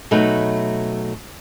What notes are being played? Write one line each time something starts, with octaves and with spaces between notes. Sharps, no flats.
B2 F#3 A3 D#4 B4